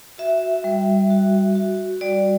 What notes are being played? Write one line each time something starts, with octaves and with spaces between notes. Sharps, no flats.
F#4 E5
G3
F#4
F#4
G3 D5